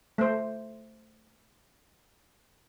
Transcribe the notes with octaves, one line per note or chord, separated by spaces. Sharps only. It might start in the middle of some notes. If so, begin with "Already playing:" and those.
A3 C5